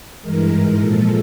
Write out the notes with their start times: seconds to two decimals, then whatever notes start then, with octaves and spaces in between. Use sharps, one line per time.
0.21 G2 E3 G#3 A#4
0.50 G#2 E3 G#3
0.78 A#2 F3 G#3 A4